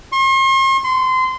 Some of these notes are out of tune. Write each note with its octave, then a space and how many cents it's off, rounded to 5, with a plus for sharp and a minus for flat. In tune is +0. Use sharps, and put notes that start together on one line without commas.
C6 +45
C6 -25